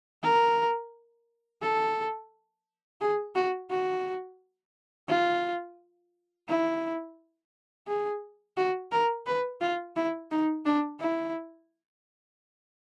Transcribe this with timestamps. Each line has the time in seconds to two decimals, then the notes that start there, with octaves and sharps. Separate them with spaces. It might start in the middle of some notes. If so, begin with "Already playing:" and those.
0.23 A#4
1.62 A4
3.01 G#4
3.35 F#4
3.70 F#4
5.09 F4
6.48 E4
7.87 G#4
8.57 F#4
8.92 A#4
9.26 B4
9.61 F4
9.96 E4
10.31 D#4
10.66 D4
11.00 E4